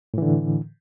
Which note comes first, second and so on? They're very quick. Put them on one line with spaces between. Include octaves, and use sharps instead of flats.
A2 E3 D3